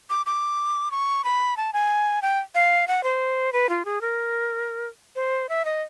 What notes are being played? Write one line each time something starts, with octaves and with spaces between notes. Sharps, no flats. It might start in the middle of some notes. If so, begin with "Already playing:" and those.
D6
D6
C#6
B5
A5
G#5
G5
F5
F#5
C5
B4
F4
G#4
A#4
C5
E5
D#5